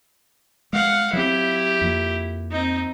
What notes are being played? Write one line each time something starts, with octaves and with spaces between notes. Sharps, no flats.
G#3 F5 F#5
F#3 C4 E4 G4
F2 A#3
C4 D#4